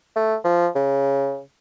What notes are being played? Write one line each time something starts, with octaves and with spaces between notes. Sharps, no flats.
A3
F3
C#3